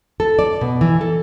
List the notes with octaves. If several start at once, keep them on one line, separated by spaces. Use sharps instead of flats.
A4
D5
B2
E3
A4